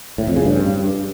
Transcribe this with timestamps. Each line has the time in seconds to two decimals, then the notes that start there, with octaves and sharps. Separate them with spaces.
0.18 A2
0.27 F2
0.36 C#3
0.45 G2